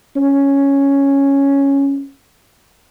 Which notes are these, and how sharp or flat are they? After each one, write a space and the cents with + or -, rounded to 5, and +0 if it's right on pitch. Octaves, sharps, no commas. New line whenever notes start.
C#4 +0